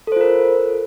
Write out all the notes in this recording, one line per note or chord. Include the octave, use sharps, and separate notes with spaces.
F4 A4 A#4 C5